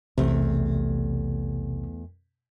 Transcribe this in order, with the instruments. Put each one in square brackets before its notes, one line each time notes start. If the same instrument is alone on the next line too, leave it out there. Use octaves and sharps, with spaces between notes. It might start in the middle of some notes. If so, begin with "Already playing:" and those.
[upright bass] B1 [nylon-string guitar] E2 A3 [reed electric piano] C3